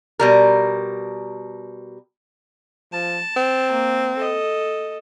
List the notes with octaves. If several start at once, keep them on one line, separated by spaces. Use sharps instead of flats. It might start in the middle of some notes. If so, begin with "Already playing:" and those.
B2 G3 A#4
F3 A5
C4
A#3
A4 D#5